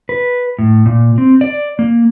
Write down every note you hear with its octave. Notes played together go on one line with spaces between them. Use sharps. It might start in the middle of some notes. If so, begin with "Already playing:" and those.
B4
A2
A#2
C4
D5
A#3